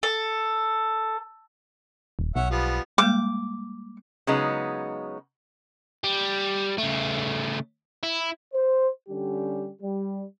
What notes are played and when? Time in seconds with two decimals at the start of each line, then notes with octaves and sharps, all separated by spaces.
0.03 A4
2.19 D#1
2.36 B1 C#4 E5 F#5
2.50 F3 G3 B3
2.98 G3 G#3 A#3 D6
4.27 C#3 F#3 G#3 B3 D#4
6.04 G3
6.78 C#3 A3
8.03 E4
8.54 C5
9.09 D3 G3 C#4 G4
9.82 G3